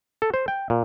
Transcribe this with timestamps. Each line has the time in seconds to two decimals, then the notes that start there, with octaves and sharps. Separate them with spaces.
0.22 A4
0.34 C5
0.48 G5
0.70 A#2